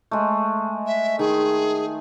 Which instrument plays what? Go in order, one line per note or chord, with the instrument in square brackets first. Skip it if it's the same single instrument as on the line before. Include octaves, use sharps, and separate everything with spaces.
[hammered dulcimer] G#3 A3
[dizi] E5
[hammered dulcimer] D#3 [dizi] G#4